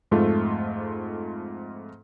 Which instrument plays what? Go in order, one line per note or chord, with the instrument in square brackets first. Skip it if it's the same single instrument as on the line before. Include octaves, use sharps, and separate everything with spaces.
[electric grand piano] F2 G#2 G#3 A3 F4 A4